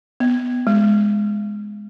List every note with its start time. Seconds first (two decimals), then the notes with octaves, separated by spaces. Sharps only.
0.20 B3
0.67 G#3